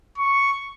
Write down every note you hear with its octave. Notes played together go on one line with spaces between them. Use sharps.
C#6